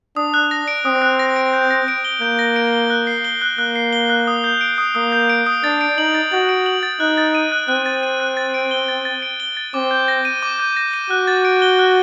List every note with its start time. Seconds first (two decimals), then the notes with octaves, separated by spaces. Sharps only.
0.17 D4 D#6
0.34 F#6
0.51 A#6
0.68 D7
0.85 C4 D#6
1.02 F#6
1.19 A#6
1.36 D7
1.53 G6
1.71 A#6
1.88 D7
2.05 G7
2.21 A#3 G6
2.39 A#6
2.56 D7
2.73 G7
2.90 F#6
3.07 C7
3.25 G7
3.42 F#6
3.58 A#3 F#6
3.76 C7
3.93 G7
4.10 F#6
4.27 D#6
4.44 G6
4.61 D7
4.78 D#6
4.95 A#3 D#6
5.12 G6
5.30 D7
5.46 D#6
5.64 D4 A6
5.81 D7
5.97 D#4 F#7
6.15 A6
6.32 F#4 A6
6.49 D7
6.66 F#7
6.83 A6
7.00 D#4 F#6
7.18 A6
7.35 D#7
7.52 F#6
7.68 C4 F#6
7.86 A6
8.03 D#7
8.20 F#6
8.37 A6
8.54 D7
8.71 G7
8.88 A6
9.05 A6
9.22 D7
9.40 G7
9.57 A6
9.74 C4 D6
9.91 G6
10.08 A#6
10.25 D#7
10.43 D6
10.59 G6
10.77 A#6
10.94 D#7
11.10 F#4 F#6
11.28 A6
11.45 D7
11.62 G7
11.79 F#6